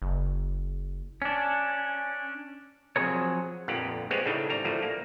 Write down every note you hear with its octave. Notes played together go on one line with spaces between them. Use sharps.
F#1
C#4 D4
F3 F#3 C4 G#4 A#4 C#5
G1 F2 A#2 D3 G4 F#5
G#3 B3 C4 G4 C#5
A2 C#3 G3 A3 D4 D#4
G#1 G3 A#5
D2 A2 F3 G3 A3
A#3